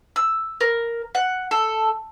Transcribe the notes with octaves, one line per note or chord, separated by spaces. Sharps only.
E6
A#4
F#5
A4